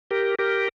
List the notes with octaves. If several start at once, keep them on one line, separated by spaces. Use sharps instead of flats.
G4 A#4
G4 A#4